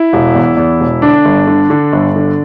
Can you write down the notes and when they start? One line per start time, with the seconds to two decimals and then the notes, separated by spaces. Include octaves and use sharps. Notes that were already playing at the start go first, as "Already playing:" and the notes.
Already playing: E4
0.13 E1
0.35 E2
0.57 E2
0.80 E1
1.02 D3 D4
1.25 G1
1.47 D3
1.70 D3
1.93 G1
2.16 D3